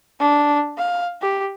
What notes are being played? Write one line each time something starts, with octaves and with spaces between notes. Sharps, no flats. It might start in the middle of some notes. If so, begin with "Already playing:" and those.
D4
F5
G4